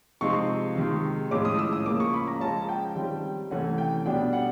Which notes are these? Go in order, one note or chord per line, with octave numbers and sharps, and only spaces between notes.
C3 F3 G#3 C4 D#4 C#6
C3 D#3 G#3
A2 F3 G#3 C#4 D6
D#6
E6
D#6
C#3 F3 A#3 D6
C#6
B5
A#5
F3 G#3 C#4 A5
G5
D#3 G3 C4
C3 E3 A3 C#4 F#5
G5
B2 G3 B3 D4 G5
F#5